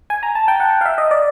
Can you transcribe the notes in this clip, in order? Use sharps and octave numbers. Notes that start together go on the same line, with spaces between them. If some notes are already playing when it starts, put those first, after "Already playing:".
G#5
A#5
A5
G5
F#5
F5
E5
D#5
D5